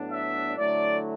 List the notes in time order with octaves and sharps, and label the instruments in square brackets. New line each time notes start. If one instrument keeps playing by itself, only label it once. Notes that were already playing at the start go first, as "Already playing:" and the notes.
Already playing: [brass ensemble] A2 F#3 B3 D4
E5
D3 F#3 A3 E4 D5